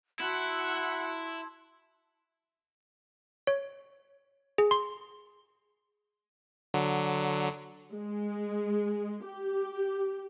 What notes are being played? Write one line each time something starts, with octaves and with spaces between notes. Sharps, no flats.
E4 F#4 F#5 A5 C6 E6
C#5
G#4
C6
D3 F#3
G#3
G4